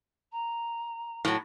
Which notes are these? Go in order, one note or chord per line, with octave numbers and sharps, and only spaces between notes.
A#5
A2 F#3